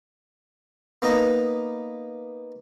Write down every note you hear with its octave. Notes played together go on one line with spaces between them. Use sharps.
A#3 B3 D#4 A#5